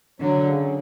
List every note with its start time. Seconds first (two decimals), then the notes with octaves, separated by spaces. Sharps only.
0.20 D3 F#3
0.44 C#3